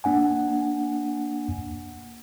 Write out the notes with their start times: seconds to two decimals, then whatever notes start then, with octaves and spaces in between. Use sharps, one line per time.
0.04 A#3 D4 F#5 G#5